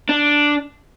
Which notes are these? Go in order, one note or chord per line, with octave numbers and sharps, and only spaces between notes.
D4